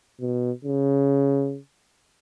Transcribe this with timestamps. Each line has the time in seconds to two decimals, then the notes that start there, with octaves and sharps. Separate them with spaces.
0.20 B2
0.65 C#3